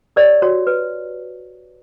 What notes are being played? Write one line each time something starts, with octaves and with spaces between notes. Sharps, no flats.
G4 A#4 C#5 D5
F#4 C#5
B4